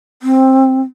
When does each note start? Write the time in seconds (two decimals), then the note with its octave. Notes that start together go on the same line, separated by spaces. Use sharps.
0.22 C4